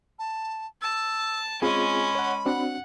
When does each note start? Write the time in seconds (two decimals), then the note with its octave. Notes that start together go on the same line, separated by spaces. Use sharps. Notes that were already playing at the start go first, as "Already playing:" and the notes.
0.19 A5
0.82 A5 E6
1.62 G#3 C4 C#4 F4 G#4 B5
2.15 C#5 F#5
2.46 C4 D4 F#4 F#5